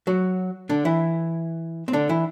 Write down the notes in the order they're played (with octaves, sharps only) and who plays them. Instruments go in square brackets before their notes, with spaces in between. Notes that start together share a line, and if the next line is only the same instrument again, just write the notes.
[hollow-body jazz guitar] F#3 F#4
D3 D4
E3 E4
C4
D3 D4
E3 E4